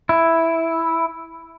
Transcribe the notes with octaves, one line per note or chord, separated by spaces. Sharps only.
E4